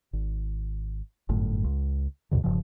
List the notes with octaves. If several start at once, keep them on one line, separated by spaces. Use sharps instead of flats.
G#1
G1 F#2 A2
C#2
D#2 G#2 B2 D3
E1 G2 C#3 F3